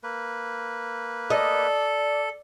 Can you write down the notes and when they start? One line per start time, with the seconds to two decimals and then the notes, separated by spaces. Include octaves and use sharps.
0.03 A#3 B4
1.30 A4 D5 D#5